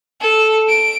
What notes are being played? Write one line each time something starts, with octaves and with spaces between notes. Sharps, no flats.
A4
D7